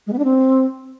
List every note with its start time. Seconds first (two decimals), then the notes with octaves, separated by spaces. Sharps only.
0.07 G#3
0.13 B3
0.19 D4
0.25 C4